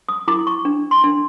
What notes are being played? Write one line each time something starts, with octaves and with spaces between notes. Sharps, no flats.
D#6
E4 D6
C#6
D4
C6
D4